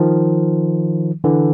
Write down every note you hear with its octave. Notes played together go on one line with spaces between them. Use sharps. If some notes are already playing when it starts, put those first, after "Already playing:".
Already playing: D#3 F3
D3 E3